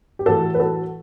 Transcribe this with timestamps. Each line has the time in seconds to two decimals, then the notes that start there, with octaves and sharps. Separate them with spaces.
0.19 G4
0.26 A2 E3 F#4 A4
0.54 B4
0.60 F#4 A4